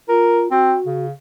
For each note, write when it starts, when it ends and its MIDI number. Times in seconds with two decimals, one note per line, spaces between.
0.09 0.49 65
0.09 0.43 70
0.51 0.75 60
0.51 1.05 66
0.86 1.11 49